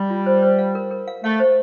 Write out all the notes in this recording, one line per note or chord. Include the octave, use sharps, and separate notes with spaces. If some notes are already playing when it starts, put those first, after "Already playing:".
Already playing: G3
F4
C5
C5
F5
A#4
A#4
F5
A3 F5
C5